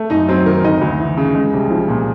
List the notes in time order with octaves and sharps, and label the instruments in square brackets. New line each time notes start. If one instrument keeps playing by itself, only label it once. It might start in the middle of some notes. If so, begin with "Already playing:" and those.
Already playing: [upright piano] A3
F#2 D#4 D#5
F#3 C4 C5
D#3 A#4
D2 D#4 D#5
D2
E3
C#3
G#3
C2
F3
A#2